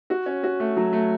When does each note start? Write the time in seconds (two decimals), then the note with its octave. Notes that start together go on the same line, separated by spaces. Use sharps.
0.10 F#4
0.26 C#4
0.43 F#4
0.60 A3
0.77 F#3
0.93 A3